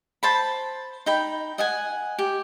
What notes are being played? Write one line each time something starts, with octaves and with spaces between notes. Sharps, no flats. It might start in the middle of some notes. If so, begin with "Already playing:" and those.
C5 A5 B5
D#4 G5 B5
D#5 F#5 G#5
G4